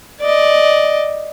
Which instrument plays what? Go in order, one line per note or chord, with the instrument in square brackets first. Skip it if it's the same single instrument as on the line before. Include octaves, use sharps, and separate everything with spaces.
[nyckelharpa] D5 D#5